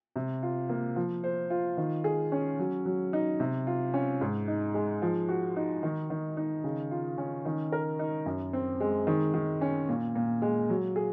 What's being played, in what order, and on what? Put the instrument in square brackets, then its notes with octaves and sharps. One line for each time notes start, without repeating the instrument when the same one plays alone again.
[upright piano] C3
F4
A#3
F3
C5
F4
D#3
G#4
C#4
F#3
F#3
D#4
C3
F4
C#4
G#2
D#4
G#3
F3
F#4
D#4
D#3
D#3
D#4
C#3
F4
C#4
D#3
A#4
D#4
F#2
C4
G#3
D#3
D#3
C#4
A#2
A#2
G#3
F#3
G#4